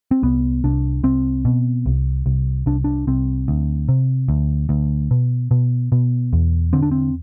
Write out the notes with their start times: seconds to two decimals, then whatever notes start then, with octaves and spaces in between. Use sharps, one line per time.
0.11 C4
0.23 C2 B3
0.64 C2 D4
1.03 C2 C4
1.45 B2
1.86 C2
2.26 C2
2.66 C2 D4
2.84 D4
3.07 C2 C4
3.48 D2
3.89 C3
4.28 D2
4.69 D2
5.11 B2
5.51 B2
5.92 B2
6.33 E2
6.73 D3 C4
6.82 D4
6.91 C4